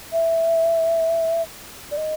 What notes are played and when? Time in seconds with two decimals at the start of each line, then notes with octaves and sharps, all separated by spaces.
0.12 E5
1.91 D5
1.97 D#5